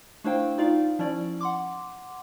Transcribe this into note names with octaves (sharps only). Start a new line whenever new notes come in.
A3 D4 E4 C5 F5 G5
D#4 F4 D5 F5
F3 C#4 E4 D5
F#5 C6 D6